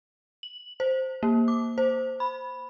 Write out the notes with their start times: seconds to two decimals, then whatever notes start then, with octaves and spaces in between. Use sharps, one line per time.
0.43 F#7
0.80 C5
1.23 A#3
1.48 D6
1.78 C5
2.20 B5